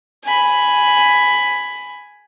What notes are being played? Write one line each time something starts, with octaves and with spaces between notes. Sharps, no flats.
G#5 B5